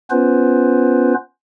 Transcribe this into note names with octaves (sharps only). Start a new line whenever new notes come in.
B3 C#4 F4 B4 C5